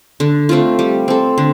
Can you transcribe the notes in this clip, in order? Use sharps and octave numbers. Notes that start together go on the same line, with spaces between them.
D3
A3 C4 F4
G3
C4 A4
D3